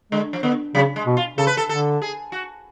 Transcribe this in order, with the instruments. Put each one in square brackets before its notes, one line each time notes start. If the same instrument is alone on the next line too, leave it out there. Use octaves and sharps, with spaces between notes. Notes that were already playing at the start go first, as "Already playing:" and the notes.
[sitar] D3 [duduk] G#3
[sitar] F3
[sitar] D3 [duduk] B3
[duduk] C#3 [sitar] F#3
[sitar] G#3
[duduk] B2
[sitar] F4
[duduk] C#3 [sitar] A4
[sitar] B4
A4
[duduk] D3 [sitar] A4
[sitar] G#4
F#4